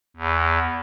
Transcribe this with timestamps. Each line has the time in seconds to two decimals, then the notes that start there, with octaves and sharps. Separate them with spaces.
0.17 E2